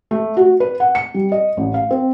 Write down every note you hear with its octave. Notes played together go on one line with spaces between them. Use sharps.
A3
F#4
B4
F#5
C#7
G3
D#5
A1
F5
C4